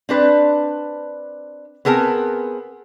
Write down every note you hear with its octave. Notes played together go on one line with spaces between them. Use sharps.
C4 D4 B4
B3 C4 G#4 A#4 A5